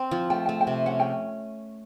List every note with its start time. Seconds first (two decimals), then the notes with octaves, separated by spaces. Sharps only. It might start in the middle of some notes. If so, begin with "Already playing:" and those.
Already playing: C4
0.11 F3
0.30 A3 G5
0.46 G5
0.49 A3
0.61 G5
0.67 C3
0.86 C#4 F#5
0.99 G5